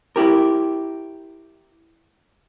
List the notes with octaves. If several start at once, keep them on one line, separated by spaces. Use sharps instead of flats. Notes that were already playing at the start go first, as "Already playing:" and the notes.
E4 G4 A#4